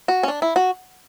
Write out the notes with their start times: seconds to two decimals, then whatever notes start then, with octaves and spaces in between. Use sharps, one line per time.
0.08 F#4
0.23 C#4
0.28 D4
0.42 E4
0.56 F#4